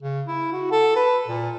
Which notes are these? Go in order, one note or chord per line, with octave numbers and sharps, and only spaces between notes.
C#3
E4
F#4
A4
B4
A#2